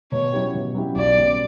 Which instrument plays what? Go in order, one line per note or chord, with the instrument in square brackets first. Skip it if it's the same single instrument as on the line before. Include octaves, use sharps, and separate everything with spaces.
[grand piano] B2 [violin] C#5
[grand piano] F#3 C#4 E4 G4
B2
F#3 C#4 E4 G4
[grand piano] B1 [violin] D5
[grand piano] B2 G3 C#4